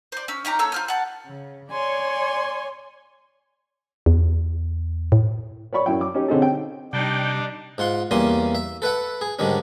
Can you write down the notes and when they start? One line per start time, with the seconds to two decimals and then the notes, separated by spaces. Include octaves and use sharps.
0.12 C5 D5
0.28 C#4 E6
0.45 C#4 D#4 G4 A#5
0.59 A#3 A4 C#5 E6
0.72 F4 C5 F6
0.88 F#5 A5
1.27 C#3
1.71 C#5 D5 G#5 C6
4.06 E2
5.12 A2
5.73 C#5 D5 B5 C#6
5.86 F#2 E4 G5
6.01 D6
6.14 C#4 D#4 G4 C#5
6.28 D3 C4 C#4 D#4 G#4 A4
6.42 G5
6.93 C3 G3 D4 D#4 G5
7.78 G#2 F4 F#5 C6
8.11 E2 G3 A#3 C#4 C6 D#6
8.55 E5
8.82 A4 B4 E5 F#5
9.21 G#4
9.39 G#2 D3 D#3 G3 C#4